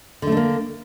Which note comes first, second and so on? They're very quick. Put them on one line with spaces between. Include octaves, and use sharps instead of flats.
D3 A3 D4 A#3